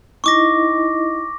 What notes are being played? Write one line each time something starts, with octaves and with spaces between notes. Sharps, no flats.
D#4 E4 D#5 C#6 D6 A#6